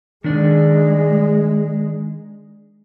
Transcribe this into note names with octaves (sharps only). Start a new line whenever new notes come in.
D#3 G#3 D4 D5